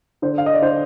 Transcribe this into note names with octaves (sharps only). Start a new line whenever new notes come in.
D3 C5
F5
D#5
D5
D3 C5